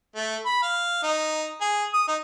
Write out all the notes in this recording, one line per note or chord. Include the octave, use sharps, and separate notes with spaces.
A3
B5
F5
D#4
G#4
D#6
D#4